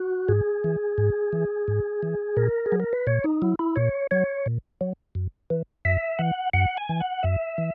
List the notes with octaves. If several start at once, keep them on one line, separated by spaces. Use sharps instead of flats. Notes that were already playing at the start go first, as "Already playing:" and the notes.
Already playing: F#4
G#2 G#4
E3
G#2
E3
G#2
E3
A#2 A#4
G#4
F#3
A#4
B4
A#2 C#5
D#4
F#3 E4
E4
A#2 C#5
F#3 C#5
A#2
F#3
F#2
E3
F#2 E5
E3 F#5
F#2 F#5
G#5
E3
F#5
F#2 E5
E3